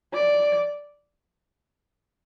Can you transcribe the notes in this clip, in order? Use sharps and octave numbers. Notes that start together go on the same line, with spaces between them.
D5